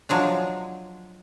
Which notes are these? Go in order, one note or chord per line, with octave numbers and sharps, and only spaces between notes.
F3 F#3 G#3 D4